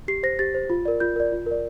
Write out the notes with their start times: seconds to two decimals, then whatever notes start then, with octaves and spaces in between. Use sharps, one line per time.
0.08 G4 C7
0.23 C5 A#6
0.39 G4 A6
0.54 C5
0.70 F4
0.85 A#4 D5
1.00 F4 G6
1.16 A#4 D5
1.32 F4
1.46 A#4 D5